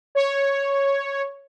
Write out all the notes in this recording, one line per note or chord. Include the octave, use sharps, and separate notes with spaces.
C#5